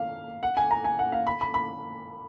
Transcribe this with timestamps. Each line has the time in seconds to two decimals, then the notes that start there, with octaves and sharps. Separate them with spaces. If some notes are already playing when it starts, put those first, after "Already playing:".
Already playing: F5
0.43 F#5
0.57 G#5
0.71 A#5
0.84 G#5
0.99 F#5
1.12 F5
1.27 B5
1.41 B5
1.54 B5